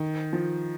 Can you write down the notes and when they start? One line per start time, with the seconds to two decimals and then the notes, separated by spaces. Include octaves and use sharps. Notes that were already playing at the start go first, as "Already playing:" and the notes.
Already playing: D#3
0.33 F3